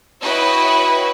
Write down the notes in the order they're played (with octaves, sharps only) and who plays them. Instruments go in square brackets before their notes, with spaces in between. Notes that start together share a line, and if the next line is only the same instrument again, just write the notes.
[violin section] E4 F#4 B4 C#5 D#5 G5